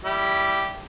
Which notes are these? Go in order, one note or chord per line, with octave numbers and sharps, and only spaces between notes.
G3 E4 G4